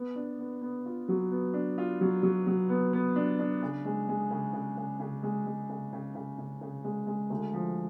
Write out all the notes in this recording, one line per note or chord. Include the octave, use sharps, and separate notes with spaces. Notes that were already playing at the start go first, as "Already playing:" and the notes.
Already playing: B3
D4
B3
B3
F4
F#3
B3
D4
F4
F#3
F#3
F#3
B3
B3
D4
D4
C#3
G#3
G#3
C#3
C#3
C#3
C#3
G#3
G#3
C#3
C#3
C#3
C#3
C#3
G#3
G#3
D2
F3